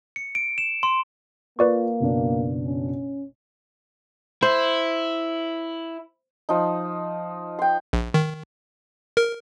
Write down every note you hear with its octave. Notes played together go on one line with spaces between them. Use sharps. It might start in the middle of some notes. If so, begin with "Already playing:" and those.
C#7
D7
E7
C6
A#3 F4 B4 D5 C#6
F#1 B2 D4
C#4
E4 C5
F3 D#4
G5 C6
A#1
D#3
A#4